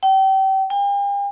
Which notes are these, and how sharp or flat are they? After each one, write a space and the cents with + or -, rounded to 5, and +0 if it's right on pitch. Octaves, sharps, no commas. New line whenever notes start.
G5 -30
G5 +45